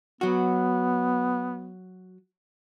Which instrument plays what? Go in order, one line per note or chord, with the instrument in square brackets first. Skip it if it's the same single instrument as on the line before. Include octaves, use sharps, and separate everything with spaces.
[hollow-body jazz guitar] F#3 F#4 [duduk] B3